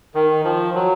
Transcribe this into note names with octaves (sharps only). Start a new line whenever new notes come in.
D#3
F3
F#3